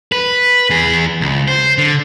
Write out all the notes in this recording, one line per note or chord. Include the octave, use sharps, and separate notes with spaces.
B4
E2 G#4
C#2
C5
D3